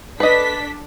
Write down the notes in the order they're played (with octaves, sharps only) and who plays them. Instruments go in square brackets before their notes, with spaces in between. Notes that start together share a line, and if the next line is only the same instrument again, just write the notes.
[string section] D4 A4 B6 [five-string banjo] B4 D#5